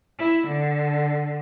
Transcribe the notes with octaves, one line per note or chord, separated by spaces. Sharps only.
E4
D3